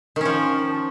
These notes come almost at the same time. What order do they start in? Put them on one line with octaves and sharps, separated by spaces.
D#3 C#4 F3